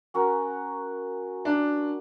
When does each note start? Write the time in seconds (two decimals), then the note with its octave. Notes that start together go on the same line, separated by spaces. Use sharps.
0.14 C#4 F#4 A#4
1.45 D4